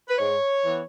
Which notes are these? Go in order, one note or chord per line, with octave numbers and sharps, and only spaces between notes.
B4
G#2 C#5
E3 B3